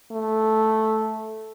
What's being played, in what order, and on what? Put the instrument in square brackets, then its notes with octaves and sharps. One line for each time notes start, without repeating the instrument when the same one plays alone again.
[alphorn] A3